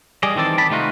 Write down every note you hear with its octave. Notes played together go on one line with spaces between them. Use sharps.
G3 G#4 D5 D#5
D#3 E3 C4 A4 D5
D5 A5 B5
C3 A3 D#4 F4 F#4